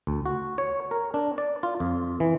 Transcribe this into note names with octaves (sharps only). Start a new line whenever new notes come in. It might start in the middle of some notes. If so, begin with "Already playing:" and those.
D2
F#4
C#5
A#4
D4
D5
F4
F2
E3